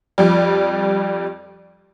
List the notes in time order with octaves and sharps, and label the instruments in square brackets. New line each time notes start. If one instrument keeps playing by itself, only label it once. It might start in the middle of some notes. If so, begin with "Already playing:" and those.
[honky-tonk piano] F2 F3 G3